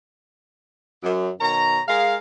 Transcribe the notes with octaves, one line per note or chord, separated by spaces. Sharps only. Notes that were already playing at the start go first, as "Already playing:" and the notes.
F#2
B2 D#3 C#5 A#5
G#3 G#4 A#4 F5